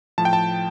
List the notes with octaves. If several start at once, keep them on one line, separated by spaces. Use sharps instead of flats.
A2 F3 A5
G5
A5